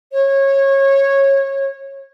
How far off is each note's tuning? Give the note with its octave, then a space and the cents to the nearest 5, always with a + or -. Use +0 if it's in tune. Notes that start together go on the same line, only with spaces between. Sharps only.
C#5 -20